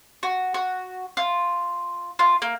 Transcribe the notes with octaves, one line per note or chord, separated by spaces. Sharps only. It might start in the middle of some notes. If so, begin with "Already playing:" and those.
F#4
F#4
F4
F4
A#3